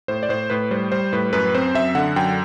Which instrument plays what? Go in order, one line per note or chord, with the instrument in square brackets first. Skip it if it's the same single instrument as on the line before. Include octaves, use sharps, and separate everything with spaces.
[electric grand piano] A2 C5
D5
A2 C5
A2 B4
G3 C5
G3 C5
A2 B4
F#2 B4
C4 C5
F#2 E5
D3 F#5
F#2 G5